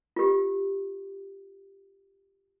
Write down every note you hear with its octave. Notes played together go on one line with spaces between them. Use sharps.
F4 G4